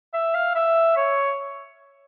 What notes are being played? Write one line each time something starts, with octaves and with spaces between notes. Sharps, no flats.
E5
F5
E5
C#5